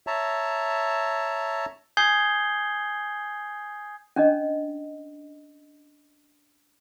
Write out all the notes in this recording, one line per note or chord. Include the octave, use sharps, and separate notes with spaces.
C#5 E5 A5 A#5
G#5 D#6 G6 G#6 C7 G7
C#4 D4 D#5